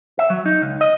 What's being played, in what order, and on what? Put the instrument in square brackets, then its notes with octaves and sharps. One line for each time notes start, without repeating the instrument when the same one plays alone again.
[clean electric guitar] E5
F#3
D#4
C#2
D#5